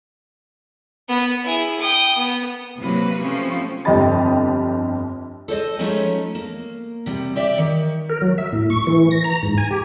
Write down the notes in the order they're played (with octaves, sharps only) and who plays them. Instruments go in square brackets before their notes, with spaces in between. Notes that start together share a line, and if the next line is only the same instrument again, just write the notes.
[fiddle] B3 B4
E4 G#4
G5 D#6
B3
[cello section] C3 E3 F#3 A#3 B4
F3 A3 C4 C#4
[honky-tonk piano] G1 F2 G4 D#5 B5 A6
[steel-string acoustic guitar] A4 C5 C#5 D#5
F3 G#3 A3 C#4 D#4 C#5
A#3
C3 G3
G4 D5 E5
D#3
[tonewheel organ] A#4
F#3
E5
A2
C#6
E3
A#6
A#5
G#2
G#5
G4